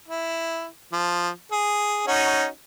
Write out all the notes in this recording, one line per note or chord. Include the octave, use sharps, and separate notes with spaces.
E4
F3
G#4
C#4 D#4 F#4